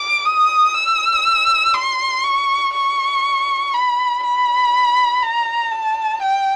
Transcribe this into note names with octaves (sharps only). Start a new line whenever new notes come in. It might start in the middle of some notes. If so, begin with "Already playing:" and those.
Already playing: D6
D#6
E6
C6
C#6
C#6
B5
B5
A#5
A5
G5